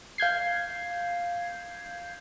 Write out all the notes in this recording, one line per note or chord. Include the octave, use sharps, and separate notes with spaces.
F5 G6 G#6 C7